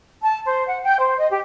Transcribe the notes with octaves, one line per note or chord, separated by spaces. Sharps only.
A5
C5
F#5
G5
C5
D#5
G4